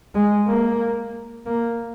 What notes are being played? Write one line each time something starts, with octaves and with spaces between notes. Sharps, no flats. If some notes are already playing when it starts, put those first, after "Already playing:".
G#3
A#3
A#3